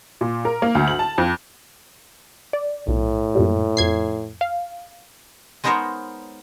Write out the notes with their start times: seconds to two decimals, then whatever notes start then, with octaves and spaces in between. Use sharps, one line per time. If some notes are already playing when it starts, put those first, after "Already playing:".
0.21 A#2
0.45 A#4
0.62 A#3
0.75 D2
0.88 F#7
0.99 A5
1.18 F2
2.53 D5
2.88 B1 A2
3.35 F#2 A#2 G3
3.77 F2 G#6 C7
4.41 F5
5.64 G#3 B3 D#4 A#4 C5 C#5